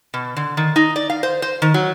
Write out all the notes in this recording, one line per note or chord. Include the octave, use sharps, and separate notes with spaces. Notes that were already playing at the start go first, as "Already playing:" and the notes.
B2
D3
D#3
D#4
D5
F5
C5
C5
D#3
F#3